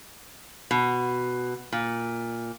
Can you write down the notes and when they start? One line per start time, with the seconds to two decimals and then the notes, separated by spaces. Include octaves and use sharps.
0.71 B2
1.72 A#2